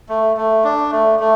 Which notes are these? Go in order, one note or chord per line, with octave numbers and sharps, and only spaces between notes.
A3
A3
D4
A3
A3